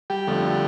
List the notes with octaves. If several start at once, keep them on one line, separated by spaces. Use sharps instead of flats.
G3 G4
F2 D3 A3